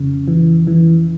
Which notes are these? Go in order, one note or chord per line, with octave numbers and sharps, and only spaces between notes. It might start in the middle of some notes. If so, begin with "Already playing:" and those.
Already playing: F2 C#3
E3
E3